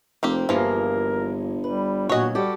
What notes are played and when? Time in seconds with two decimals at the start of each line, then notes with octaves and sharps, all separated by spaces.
0.23 F1 A#3 C4 G4
0.49 G1 G2 E3 F3 A#3 G#4 A#4
1.64 G3 B4
2.09 A#2 F#3 F#4 C#5 D#5
2.35 G3 F#4 G4 A4